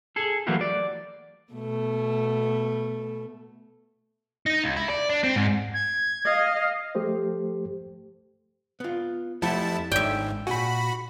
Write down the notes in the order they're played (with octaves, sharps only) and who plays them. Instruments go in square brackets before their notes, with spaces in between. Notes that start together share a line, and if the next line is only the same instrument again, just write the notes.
[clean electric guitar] G#4 A4
E3 F#3 A3 A#3 F#4 G4
D5
[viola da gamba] B2 A3
[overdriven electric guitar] D#4
C#2
E4
D5
D4
C4
G#2
[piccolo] G#6
[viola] D#5 F5
[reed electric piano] F3 A3 G4 A4 C5
[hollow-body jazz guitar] B3 F4
[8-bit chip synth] F2 E4 A5 [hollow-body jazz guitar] A3 G4 F#5
[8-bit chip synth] G#1 [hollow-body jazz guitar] G#2 C#5 D5 [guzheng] E5 G5
[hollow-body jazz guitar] A#2 F#5 G#5 [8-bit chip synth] F#4 B5